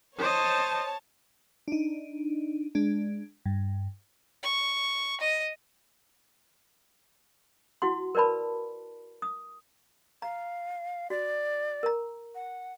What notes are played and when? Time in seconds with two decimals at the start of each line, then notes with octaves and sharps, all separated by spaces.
0.18 C5 C#5 D#5 A5
1.68 D4 D#4
2.75 G#3 D4
3.46 G2
4.43 C#6
5.20 D#5
7.82 E4 F#4 F#5 C6
8.15 A#4 B4 D5 A5 B5
9.22 D#6
10.22 F5 A#5
11.10 F#4 D5
11.83 A#4 A#5
12.35 F#5